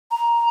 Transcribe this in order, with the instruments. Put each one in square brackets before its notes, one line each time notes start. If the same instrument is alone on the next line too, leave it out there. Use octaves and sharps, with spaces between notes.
[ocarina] A#5